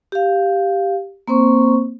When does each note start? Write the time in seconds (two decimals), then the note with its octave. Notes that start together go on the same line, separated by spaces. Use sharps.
0.12 G4 F5
1.28 A#3 C4 C5 C#6